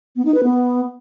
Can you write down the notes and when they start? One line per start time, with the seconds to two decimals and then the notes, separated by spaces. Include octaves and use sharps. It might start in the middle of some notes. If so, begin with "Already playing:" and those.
0.16 B3
0.25 D#4
0.34 B4
0.43 B3